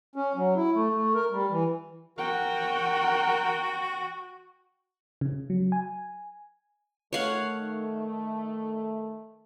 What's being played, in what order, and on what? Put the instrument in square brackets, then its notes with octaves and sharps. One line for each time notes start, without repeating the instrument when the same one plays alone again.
[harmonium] C#4
F#3
E4
A3
A3
A#4
G3
E3
[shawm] F#4 [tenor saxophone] A#4 [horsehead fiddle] F#5 G5
[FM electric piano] C#3
F#3
G#5
[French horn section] D#3 A3 [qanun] C#5 F5 F#5